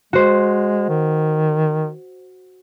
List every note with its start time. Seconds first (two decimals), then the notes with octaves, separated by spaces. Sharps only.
0.13 G#3 F#4 C5
0.89 D#3